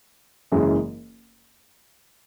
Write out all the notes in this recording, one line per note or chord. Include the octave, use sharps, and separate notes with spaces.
F#1 F#2 E3 G#3